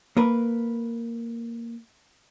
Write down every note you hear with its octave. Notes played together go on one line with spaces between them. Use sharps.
A#3 A#4 B4